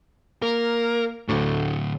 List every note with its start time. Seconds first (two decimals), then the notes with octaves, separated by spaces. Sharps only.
0.42 A#3 A#4
1.28 D2 A2 D3